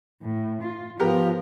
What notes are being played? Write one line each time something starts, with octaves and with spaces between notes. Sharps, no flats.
A2
F4
G#2 F3 B3 G4 A#4